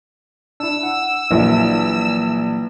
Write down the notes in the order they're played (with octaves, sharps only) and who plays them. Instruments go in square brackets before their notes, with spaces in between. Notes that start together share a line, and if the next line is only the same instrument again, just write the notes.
[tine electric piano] D4 E4 [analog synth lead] E6
[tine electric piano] F#5
[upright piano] A#1 E4 [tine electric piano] E3 F#3 A#3